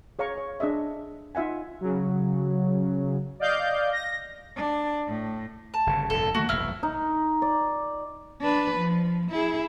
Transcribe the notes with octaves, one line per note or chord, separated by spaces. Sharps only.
G#4 C#5 F5 A#5 C#6
C#5
D4 G#4 D#5 E5
D#4 F4 E5 F#5 G#5
C#3 F#3
D5 D#5 F5 G6
A#6
D4
A2
A5
G1 C#3
F1 G2 A#2 A4
D#3 A3 A#3 F#4
F1 B1 G2 E4 F6
D#4
D5
D4 B4
F3
E4 G#4